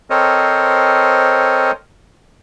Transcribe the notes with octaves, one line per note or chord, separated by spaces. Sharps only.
C4 A4 A#4 C5 C#5 D#5